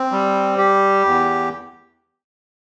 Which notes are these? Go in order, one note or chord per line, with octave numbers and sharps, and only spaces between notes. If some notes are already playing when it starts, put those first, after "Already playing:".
Already playing: C4
G3
G4
E2